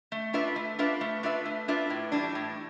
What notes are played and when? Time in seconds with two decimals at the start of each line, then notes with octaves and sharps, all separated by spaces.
0.12 A3
0.33 D4 F4 B4 E5
0.56 A3
0.79 D4 F4 B4 E5
1.01 A3
1.23 D4 F4 B4 E5
1.45 A3
1.68 D4 F4 B4 E5
1.90 A2
2.12 E3 G3 D4
2.35 A2